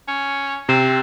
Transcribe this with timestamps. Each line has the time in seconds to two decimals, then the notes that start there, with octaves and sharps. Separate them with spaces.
0.08 C#4
0.69 C3 C4